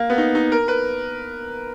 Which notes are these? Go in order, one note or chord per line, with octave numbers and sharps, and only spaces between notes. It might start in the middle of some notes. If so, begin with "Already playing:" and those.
Already playing: A#3
B3
D#4
D#4
A#4
B4